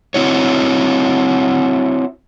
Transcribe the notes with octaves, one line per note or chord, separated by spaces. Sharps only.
C4 E4 F#4 C#5